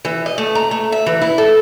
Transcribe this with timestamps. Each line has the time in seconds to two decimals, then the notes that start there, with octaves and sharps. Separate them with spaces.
0.05 E3
0.26 D#5
0.38 A3
0.55 A#5
0.71 A3
0.92 E5
1.06 E3
1.22 E4
1.38 A4